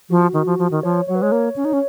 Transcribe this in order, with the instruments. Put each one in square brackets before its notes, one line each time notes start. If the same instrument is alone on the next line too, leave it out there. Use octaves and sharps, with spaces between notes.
[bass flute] F3 [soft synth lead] F#4
[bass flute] D#3
F3
F3
D#3
[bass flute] F3 [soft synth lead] C#5
[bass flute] F#3 [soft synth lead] C#5
[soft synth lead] B4
[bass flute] G#3 [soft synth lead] C#5
[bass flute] A#3
C#4
D#4
C#4